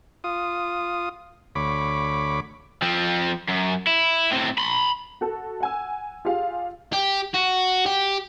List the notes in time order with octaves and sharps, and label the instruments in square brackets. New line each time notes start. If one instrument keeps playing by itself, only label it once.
[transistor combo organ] F4 D#6
D2 C#5 B5 D6
[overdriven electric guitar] F3 C4
F#2
E4
A2 C4
B5 C6
[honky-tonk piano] F#4 A4
F#5 G#5 E6
F4 G4 G#4 F5
[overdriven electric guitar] G4
F#4
G4